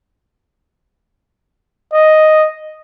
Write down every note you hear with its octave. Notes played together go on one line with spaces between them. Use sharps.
D#5